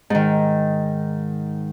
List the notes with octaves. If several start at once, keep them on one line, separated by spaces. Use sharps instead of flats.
G#2 D#3